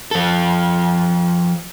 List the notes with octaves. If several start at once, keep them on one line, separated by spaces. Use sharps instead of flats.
F3 A4